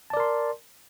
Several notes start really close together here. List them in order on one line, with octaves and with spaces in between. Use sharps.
A5 D5 A#4 C6